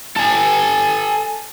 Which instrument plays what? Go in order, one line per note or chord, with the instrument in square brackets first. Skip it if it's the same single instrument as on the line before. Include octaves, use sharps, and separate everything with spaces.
[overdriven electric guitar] A4 G#5